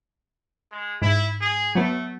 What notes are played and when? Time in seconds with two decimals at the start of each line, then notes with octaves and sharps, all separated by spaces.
0.72 G#3
1.02 G#2 E4
1.41 G#4
1.75 F#3 A3 B3